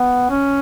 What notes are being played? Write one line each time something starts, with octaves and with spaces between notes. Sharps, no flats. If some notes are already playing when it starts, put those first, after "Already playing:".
Already playing: B3
C#4